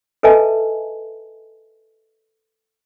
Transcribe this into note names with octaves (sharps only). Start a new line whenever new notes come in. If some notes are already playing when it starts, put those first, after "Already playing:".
A4 B4 D#5 E5 G#5 A5